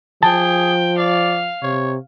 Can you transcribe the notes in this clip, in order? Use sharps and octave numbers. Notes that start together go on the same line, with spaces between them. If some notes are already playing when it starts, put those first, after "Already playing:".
F3 G#4 G5 A5
D5 F5
C3 C#5